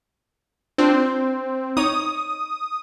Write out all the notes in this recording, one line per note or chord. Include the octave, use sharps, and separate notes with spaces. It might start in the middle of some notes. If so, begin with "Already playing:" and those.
C4 D4 F4
D#4 C#5 D#6